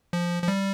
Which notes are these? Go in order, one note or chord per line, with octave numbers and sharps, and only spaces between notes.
F3
F3
G3